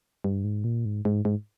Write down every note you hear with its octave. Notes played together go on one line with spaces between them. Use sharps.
G2
G#2
A#2
G#2
G#2
G#2